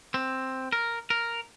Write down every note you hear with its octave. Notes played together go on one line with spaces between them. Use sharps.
C4
A#4
A#4